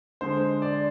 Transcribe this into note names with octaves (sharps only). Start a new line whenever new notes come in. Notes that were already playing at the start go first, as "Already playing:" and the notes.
D3 G#3 C5
D5